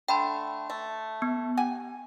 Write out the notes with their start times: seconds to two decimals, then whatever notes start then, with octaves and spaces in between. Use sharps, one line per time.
0.08 D3 A3 G5 B5 C6
0.70 A3
1.22 B3
1.57 G4 F#5 G#5